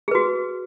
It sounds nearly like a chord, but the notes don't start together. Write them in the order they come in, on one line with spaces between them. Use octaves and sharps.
G#4 B4 F#4